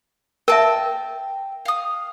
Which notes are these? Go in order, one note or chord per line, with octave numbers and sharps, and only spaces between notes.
A#4 E5 G5 A5
F5 D#6